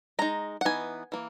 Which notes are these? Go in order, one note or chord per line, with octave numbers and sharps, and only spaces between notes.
G#3 D#4 A#5
F#5
E3 B3 D#4 G#5
E3 A#3